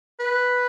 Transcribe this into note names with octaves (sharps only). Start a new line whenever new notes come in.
B4